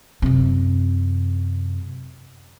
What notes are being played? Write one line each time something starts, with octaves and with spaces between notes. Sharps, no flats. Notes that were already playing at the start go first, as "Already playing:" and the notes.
F#2 C3